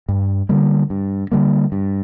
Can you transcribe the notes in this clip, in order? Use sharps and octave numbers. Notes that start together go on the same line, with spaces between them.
G2
D3 G3 A#3
G2
D3 G3 A#3
G2